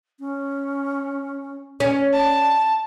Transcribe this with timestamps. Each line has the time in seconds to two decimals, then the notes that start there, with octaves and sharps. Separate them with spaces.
0.20 C#4
1.80 C#4 D5
2.13 A5